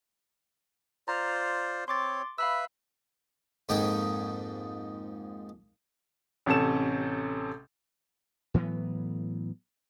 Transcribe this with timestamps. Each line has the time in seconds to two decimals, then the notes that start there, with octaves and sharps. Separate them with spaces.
1.08 F4 C5 D5 A#5
1.88 C4 C#5 C6 D6 A6
2.38 B4 E5 F5 B5 E6
3.69 F2 G#2 A#3 D#4 G5
6.46 A1 C3 C#4 A4 E7
8.54 A2 E3 F#3 B3